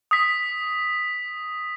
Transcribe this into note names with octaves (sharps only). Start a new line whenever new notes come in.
D#6 B6